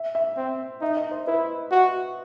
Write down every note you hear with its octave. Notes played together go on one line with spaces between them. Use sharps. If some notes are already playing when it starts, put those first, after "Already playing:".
Already playing: E5
E5
C4
D#4 E5
D#5
C5
E4 B4
F#4